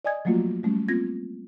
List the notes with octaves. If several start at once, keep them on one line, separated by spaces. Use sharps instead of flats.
D5 D#5 G#5 D#6 G#6
F3 F#3 A3 A#3 F4 F#4
G3 A3 C#4
A#3 C4 F4 G#6 A#6